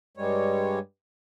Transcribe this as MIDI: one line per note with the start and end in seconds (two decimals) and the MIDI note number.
0.17 0.79 43
0.17 0.79 55
0.17 0.79 56
0.17 0.79 73